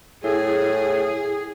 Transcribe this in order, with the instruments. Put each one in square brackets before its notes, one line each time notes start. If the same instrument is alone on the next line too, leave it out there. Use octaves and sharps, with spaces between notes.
[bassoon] A2 [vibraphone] E4 [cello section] G#4